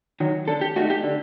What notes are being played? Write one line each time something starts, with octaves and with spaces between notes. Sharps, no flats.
D#3 F#3
D3 A4
G4
A3 D#4 F#4
G4
D3